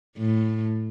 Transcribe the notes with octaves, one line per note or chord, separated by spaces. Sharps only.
A2